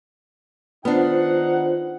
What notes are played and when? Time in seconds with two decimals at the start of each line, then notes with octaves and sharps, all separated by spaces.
0.85 D#3 B3 D4 D#4 F4 C5 F#5